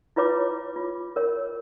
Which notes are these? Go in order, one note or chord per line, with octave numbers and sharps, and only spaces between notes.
E4 F4 B4 C#5 D6
F4
A#4 C#5